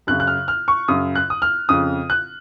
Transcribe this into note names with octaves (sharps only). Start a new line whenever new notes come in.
F#2 C#3 F#6
F#6
F6
F6
C#6
F#2 C#3 D#6
F#6
D#6
F6
F2 C#3 D#6
F#6